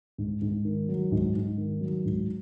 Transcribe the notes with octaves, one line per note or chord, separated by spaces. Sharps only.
G#2
G#2
D#3
F#3
G#2
G#2
D#3
F#3
G#2